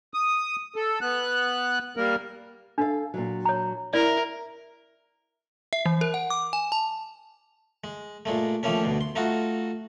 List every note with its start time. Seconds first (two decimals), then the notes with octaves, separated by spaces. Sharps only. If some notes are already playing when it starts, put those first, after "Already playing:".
0.14 D#6
0.76 A4
1.01 B3 F#6
1.97 G3 A#3 A#4
2.78 D4 A4 F5
3.14 A#2 F#3
3.45 C#5 A#5
3.94 E4 A#4 D5
5.73 E5
5.86 E3
6.01 A#4
6.14 F#5
6.30 D6
6.53 G#5
6.72 A5
7.84 G#3
8.25 A#2 G#3 A3
8.63 D#3 F3 A3 A#3 C#4
8.84 D2 B2
9.01 C6
9.16 A3 D#4 F4 F#4